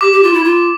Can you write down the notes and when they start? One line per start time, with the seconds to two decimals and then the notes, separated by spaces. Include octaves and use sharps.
0.01 G4 D6
0.12 G4
0.23 F4
0.34 E4
0.44 F4